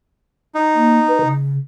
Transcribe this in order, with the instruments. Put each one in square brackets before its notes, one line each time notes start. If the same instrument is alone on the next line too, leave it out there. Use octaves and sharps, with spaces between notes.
[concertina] D#4
[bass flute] A#3
B4
C#3